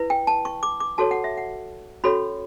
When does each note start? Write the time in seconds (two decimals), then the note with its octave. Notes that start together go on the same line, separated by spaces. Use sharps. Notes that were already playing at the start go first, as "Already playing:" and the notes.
Already playing: E4 B4
0.10 G5
0.27 A5
0.45 C#6
0.63 D6
0.80 D6
0.98 F#4 A4 C#5 A5
1.11 F#5
1.24 E5
1.37 F#5
2.04 C#4 F#4 A4 C#5 B5